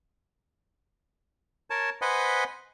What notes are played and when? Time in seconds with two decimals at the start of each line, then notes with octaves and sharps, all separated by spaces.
1.70 A#4 C#5 A5
2.02 B4 C5 D#5 F#5 G#5 B5